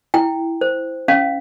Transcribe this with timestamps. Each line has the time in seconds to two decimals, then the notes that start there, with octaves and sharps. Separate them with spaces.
0.14 E4 G5
0.61 C5
1.08 C#4 F5